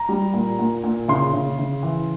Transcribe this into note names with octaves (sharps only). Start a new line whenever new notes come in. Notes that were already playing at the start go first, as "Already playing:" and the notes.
Already playing: A#5
G3
A#2
A#2
A#2
C#3 C6
C#3
C#3
E3